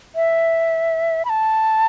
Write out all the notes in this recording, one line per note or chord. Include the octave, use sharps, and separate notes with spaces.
E5
B5
A5